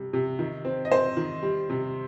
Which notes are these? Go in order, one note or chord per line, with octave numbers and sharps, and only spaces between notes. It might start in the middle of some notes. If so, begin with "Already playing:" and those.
Already playing: C3 G3
C3
D#3
C4
D#5
C4 C5
D#3
G3
C3